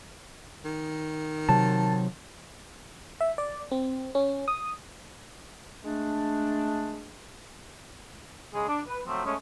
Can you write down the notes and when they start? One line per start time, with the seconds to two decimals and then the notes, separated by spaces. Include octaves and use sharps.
0.65 D#3
1.49 C3 F#3 A5
3.21 E5
3.38 D5
3.71 C4
4.15 C#4
4.48 D#6
5.84 G#3 A3 D4
8.53 C#3 G#3 G#4
8.68 D4
8.87 B4
9.07 F3 F#3 A3 C4
9.25 G#3 A3 C#4